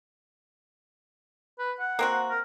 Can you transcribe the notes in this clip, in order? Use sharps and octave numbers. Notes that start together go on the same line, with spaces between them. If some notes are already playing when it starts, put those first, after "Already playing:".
B4
F#5
A#3 C4 F#4
A#4